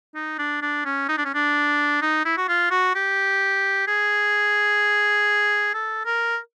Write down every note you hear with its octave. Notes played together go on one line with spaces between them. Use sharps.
D#4
D4
D4
C#4
D#4
D4
C#4
D4
D#4
E4
F#4
F4
F#4
G4
G#4
A4
A#4